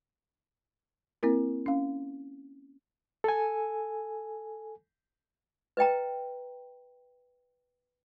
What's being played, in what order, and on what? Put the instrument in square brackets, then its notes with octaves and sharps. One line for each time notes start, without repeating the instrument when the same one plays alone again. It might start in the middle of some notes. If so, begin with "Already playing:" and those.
[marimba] A#3 C4 E4 A#4
C#4 F5
[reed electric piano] A4 G#5
[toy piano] B4 D#5 G5 A#5